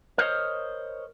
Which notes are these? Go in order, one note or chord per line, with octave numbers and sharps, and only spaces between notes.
A#4 C5 C#5 D#5